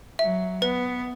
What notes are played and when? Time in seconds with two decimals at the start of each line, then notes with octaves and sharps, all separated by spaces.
0.19 F#3 E5
0.62 B3 B4